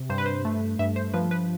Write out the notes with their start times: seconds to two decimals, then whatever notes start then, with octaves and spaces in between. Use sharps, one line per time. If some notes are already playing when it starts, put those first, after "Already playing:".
Already playing: C3
0.10 G2 C5
0.18 B4
0.26 C5
0.45 A3
0.79 G2 E5
0.96 C5
1.14 F3 B4
1.31 B4